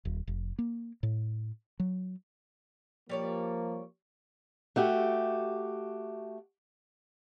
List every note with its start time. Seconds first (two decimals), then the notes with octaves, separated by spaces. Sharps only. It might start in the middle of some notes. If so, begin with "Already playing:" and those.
0.05 D#1
0.27 F1
0.59 A#3
1.03 A2
1.80 F#3
3.09 F3 G3 A#3 C#5 D5
4.76 A3 F#4 G4